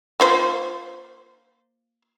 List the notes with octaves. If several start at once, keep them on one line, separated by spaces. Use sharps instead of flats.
A#3 F4 C5